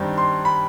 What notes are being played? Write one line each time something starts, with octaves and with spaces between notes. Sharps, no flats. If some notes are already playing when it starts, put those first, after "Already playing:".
Already playing: G2 D#3 G3 C4
C6
B5